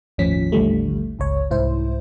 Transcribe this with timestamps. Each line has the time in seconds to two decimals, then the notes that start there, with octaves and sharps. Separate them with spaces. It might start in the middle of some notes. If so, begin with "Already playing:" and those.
0.18 G1 D#2 A2 F3 C#4 B6
0.52 A1 D#2 D3 F3 G3 A3
1.19 G1 C#2 C#5
1.51 C2 G#2 E4 C5